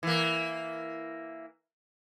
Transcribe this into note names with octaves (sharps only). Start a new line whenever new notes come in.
E3 A#3